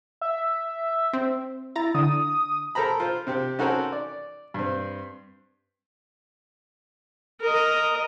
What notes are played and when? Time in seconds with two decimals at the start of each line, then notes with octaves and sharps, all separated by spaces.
0.21 E5
1.13 C4
1.76 E4 A#5 A6
1.95 D3 D#6
2.75 A4 A#4 C5 A#5 B5
3.00 F4 C5
3.27 C3 C4 G4
3.59 C#4 D#4 F#4 A4 A#4 C5
3.92 D5
4.54 G2 C4
7.41 A#4 D#5